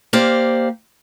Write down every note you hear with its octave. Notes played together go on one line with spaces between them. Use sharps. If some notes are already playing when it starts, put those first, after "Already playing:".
A#3 G4 C5 D5 F5